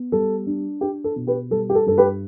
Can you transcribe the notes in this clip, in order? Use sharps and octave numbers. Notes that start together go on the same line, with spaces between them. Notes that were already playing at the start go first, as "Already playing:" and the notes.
Already playing: B3
G3 A4
D4
D4 G4
A4
B2
G4 B4
G3 A4
G4
A4
G2 A4
G4 B4